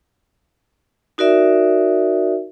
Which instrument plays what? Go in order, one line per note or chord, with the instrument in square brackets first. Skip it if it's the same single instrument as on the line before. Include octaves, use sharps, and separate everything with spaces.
[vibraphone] D#4 F#4 A#4 D5 E5